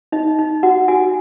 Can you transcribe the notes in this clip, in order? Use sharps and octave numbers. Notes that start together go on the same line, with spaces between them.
D#4 D#5
D#4
F#4 F#5
F#4 G#5